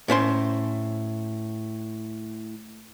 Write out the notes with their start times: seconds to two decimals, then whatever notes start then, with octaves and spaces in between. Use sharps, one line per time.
0.08 A2 C#4 C5 C6